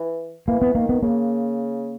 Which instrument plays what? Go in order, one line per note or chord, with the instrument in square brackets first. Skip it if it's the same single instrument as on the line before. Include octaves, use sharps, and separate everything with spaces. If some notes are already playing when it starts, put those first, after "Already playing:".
Already playing: [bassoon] E3
[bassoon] E3 [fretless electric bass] A#3
[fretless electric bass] B3
[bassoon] D#3 [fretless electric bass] A#3
[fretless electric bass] B3
[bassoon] C#3 [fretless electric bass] A#3